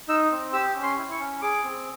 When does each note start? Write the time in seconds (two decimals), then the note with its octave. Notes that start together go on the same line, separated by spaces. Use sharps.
0.08 D#4 E6
0.31 C4
0.53 G4 E6
0.75 C#4
0.83 C6
0.98 E4
1.11 C#6
1.19 C#4
1.42 G#4 D6
1.64 C4